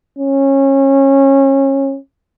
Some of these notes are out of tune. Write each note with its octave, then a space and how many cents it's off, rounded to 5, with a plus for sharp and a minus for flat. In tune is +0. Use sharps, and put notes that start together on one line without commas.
C#4 -25